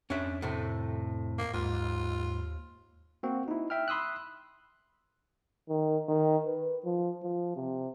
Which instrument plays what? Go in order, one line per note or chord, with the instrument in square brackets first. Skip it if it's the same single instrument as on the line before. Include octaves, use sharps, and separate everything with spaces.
[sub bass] F2 [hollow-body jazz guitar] C#4 D4 E5
[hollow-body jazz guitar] A2 C3 A3
[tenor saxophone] A#3
[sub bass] D#2 [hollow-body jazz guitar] G#2 [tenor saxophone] F4
[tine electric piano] A#3 C4 F#4
D#4 E4
E5 G5 F6
B5 C6 D#6 E6 F#6
[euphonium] D#3
D#3
B4
F3
F3
C3